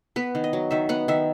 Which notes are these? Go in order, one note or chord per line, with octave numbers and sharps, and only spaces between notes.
B3 B4
D#3
D#5
F#3
D#3 E5
B3 F#5
D#3 E5